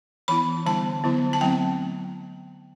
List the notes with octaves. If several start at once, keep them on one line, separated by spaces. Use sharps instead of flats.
E3 B3 E4 B5
D3 G3 B3 D4 A5
D3 F#3 B3 E4
A5
F#3 A3 C4 G5